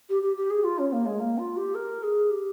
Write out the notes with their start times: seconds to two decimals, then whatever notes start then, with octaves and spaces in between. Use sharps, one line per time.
0.09 G4
0.22 G4
0.37 G4
0.50 G#4
0.64 F4
0.78 C#4
0.92 A#3
1.06 G#3
1.20 A#3
1.38 F4
1.57 G4
1.75 A#4
2.03 G#4
2.31 G4